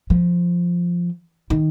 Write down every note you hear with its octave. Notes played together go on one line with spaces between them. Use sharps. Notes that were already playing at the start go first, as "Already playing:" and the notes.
F3
D#3